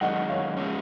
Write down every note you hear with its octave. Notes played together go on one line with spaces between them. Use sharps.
F#2 D#3 G#3 D#5 F#5
C#5 F5
F3 G#3 C#4